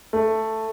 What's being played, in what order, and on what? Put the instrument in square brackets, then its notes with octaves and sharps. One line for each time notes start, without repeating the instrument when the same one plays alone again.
[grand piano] A3